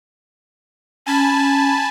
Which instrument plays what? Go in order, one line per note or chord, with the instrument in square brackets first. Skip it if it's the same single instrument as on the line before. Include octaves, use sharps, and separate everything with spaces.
[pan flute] C#4 [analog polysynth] G#5 A5 B5